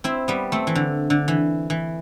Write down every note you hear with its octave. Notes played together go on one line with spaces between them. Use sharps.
C4 E4
G3 B3
A3 C4
E3
D3
D3
E3
E3